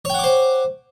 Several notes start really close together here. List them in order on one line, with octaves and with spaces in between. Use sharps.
C#5 G5 F#5 D6 C5